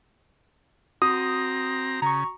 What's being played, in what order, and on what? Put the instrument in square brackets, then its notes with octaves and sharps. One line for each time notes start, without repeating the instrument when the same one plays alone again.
[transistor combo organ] C4 A#5 [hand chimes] F#4 [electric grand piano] D#6
[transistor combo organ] C#3 [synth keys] A#5 C#6